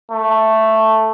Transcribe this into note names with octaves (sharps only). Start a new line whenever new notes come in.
A3